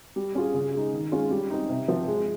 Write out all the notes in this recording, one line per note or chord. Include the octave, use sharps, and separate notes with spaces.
G3
C#4 F4 G#4
C#3
G#3 D#4
D#3
G#3 C#4 F4
G3
C4 D#4
C3
F3 C4
G#3